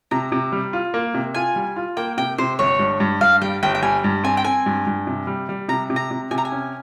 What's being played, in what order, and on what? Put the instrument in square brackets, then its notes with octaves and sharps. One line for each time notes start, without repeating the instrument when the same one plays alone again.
[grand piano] C3 [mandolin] A#5
[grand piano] C3
G3
F4
A#3
C3
[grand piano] F4 [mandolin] G#5
[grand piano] G3
F4
[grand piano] A#3 [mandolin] G5
[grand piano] C3 [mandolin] G5
[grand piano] C3 [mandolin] C5
[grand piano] G1 [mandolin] C#5
[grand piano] G2
G2
[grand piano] G2 [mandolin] F5
[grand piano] G3 [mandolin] G5
[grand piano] G1 [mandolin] G5
[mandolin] G5
[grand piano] G3 [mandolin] G#5
[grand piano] G2
[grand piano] C4 [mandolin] G#5
[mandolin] G5
[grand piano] C4 [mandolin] G#5
[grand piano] G2
G2
C3
G3
G3
[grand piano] C3 [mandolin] A#5
[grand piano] C3
[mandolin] A#5
[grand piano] C3
[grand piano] C3 [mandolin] G#5
[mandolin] A#5
G#5
[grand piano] C#4